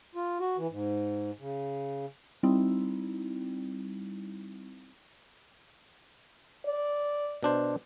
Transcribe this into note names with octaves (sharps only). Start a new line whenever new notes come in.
F4
F#4
E3
G#2
C#3
G3 C4 D#4 E4
D5
B2 D4 C5